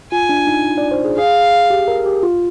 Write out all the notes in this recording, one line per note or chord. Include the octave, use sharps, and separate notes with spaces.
F4 G#5
D4
D#4
D5
C5
G#4
G#4 F5
G4
A#4
G4
F4